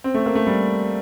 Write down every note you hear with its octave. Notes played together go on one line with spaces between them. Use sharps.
C4
A3
A#3
A3
G3